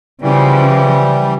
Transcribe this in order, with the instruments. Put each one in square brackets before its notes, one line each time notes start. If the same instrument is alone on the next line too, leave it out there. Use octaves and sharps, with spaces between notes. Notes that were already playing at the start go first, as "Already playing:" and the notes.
[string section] C#3 F3 [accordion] E3 G3